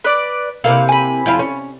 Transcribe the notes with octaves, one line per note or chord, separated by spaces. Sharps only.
B4 D5
C3 A#3 E4 F5
G#5 B5
F2 E4 F4
C#4